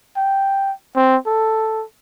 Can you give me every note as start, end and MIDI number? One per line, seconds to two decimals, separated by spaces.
0.17 0.72 79
0.96 1.16 60
1.26 1.84 69